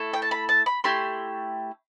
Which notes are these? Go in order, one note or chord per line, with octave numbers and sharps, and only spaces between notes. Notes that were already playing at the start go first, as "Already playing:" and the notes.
Already playing: A3 E4 A4
G5
A5
B5
A5
B5
A3 E4 G4 C6